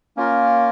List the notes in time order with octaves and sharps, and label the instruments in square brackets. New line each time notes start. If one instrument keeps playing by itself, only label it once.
[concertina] A#3 C#4 F4 A#4